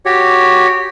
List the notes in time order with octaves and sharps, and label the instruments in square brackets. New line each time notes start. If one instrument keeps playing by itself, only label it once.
[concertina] F#4 G4 C#5